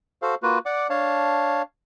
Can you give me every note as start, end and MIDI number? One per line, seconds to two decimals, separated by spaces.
0.22 0.35 66
0.22 0.35 69
0.22 0.35 72
0.22 0.35 77
0.43 0.59 58
0.43 0.59 65
0.43 0.59 66
0.43 0.59 71
0.66 0.87 74
0.66 0.87 78
0.66 0.87 86
0.90 1.62 62
0.90 1.62 73
0.90 1.62 77
0.90 1.62 81